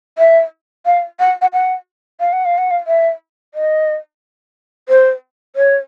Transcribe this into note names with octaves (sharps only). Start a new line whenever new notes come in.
E5
F5
F#5
F#5
F#5
F5
F#5
F5
F#5
F5
E5
D#5
C5
C#5